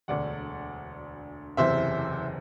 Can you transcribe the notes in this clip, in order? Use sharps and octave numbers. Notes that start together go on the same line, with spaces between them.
E1 D2 D3 D5 F#5
F#1 E2 C3 C5 E5